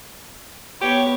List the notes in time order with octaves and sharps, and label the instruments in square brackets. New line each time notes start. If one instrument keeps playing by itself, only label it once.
[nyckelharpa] B3 C#5 [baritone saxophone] G4